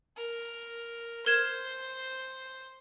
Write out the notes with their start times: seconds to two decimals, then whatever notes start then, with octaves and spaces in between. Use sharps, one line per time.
0.16 A#4
1.26 A#4 C5 G#6 E7